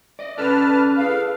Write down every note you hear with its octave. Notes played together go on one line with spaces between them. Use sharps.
D5 D#5
C#4 A4 B4 D5 A5 F6
G#4 B4 F5